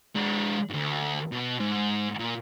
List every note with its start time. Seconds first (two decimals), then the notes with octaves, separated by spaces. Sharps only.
0.15 G#3 D4
0.70 D2 G#2
1.32 B2
1.60 G#2
2.19 A#2